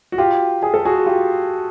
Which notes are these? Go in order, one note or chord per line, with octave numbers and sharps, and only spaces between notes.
F#4
F4 G4
G#4
A4
F#4 G#4
F4 G4